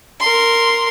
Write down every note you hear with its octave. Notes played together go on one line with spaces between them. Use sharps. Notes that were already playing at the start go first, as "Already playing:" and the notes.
A#4 C6